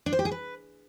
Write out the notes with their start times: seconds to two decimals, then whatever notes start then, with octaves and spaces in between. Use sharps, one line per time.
0.06 D4
0.13 C5
0.19 G4
0.25 G#4
0.31 B4